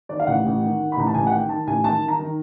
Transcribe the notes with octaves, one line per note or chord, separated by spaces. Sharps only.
D#3 D5
F5
A1 F#5
A1
D#3
D#3
B5
A1 A#5
A5
A1 G#5
F#5
D#3 G5
D#3 A5
A1 G#5
D#3 A5
D#3
A#5
D#3